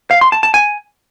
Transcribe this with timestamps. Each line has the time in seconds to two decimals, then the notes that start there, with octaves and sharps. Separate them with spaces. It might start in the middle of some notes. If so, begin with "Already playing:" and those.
0.11 F5
0.21 C6
0.32 A5
0.43 A5
0.54 G#5